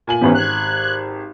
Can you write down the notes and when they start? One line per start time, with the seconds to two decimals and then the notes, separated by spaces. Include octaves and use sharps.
0.07 A#2 G#5 F#7
0.21 G#1 E3 B3 C#4 G4
0.35 F#6 G#6